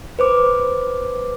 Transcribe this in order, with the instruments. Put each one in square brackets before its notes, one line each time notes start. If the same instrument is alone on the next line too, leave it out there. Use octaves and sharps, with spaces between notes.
[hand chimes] B4 C5 D6